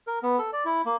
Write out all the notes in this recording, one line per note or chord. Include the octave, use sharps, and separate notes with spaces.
A#4
B3
A4
D5
E4
A#3